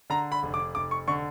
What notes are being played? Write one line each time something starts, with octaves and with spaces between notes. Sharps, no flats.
D3 A#5
B5
F1
D6
F1 D6
C#6
D3 C#6